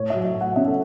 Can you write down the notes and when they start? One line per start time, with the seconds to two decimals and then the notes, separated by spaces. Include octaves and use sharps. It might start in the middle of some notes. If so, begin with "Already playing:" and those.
Already playing: A2 C#5
0.10 F#3 E5
0.25 E5
0.35 A2
0.41 F#5
0.56 C#4 E5
0.67 A4